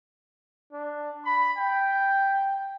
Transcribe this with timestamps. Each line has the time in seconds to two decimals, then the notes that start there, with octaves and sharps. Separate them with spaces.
0.72 D4
1.25 B5
1.58 G5